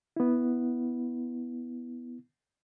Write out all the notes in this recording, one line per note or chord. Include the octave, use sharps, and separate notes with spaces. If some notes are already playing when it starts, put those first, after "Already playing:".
B3 E4